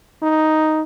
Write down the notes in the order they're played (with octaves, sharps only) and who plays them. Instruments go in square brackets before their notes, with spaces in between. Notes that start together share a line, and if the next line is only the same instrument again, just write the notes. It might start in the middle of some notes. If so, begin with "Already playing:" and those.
[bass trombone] D#4